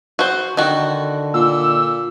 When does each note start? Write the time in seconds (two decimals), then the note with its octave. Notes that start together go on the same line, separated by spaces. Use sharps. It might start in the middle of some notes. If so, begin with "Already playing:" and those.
0.19 F#4 C5
0.57 D3 D#3 F#4
1.34 A#2 E6